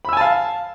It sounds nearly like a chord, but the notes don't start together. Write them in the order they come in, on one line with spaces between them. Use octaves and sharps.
B5 E6 G#5 A5 F5